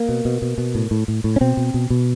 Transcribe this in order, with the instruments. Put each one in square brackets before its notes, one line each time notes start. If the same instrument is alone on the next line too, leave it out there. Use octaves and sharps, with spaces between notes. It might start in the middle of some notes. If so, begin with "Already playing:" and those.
Already playing: [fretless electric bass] A#3
B2
B2
B2
B2
A2
A2
A2
A2
C#4
B2 C4
B2
B2
B2